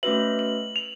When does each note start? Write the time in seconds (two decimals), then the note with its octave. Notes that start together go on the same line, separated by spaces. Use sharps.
0.03 A3 C#4 F#4 B4 E5 F#7
0.39 F#7
0.76 F7